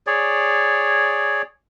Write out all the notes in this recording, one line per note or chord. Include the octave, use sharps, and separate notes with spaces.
G#4 C#5 D5